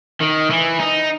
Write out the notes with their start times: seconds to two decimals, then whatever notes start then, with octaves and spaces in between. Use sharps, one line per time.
0.21 D#3
0.50 E3
0.80 D#4